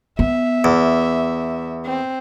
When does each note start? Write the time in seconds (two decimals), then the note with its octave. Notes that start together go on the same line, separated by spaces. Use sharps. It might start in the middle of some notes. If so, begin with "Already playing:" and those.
0.19 B3 E5
0.64 E2
1.86 C4